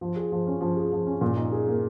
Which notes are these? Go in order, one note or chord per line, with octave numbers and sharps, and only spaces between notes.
F3
G#4
F3
C#4
F3
G#4
F3
C#4
A#2
D#4
G#4
A#3